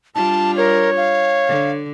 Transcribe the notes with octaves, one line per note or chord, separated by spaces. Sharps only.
G3 D4 F4 A5
A#4 C#5
F5
D3